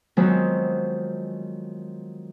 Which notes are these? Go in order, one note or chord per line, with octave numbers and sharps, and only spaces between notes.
D#3 F3 F#3 G#3 B3 C4